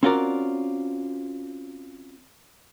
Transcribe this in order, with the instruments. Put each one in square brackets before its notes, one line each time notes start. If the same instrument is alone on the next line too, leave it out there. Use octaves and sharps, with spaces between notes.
[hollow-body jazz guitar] C4 C#4 F4 F#4 A#4 D5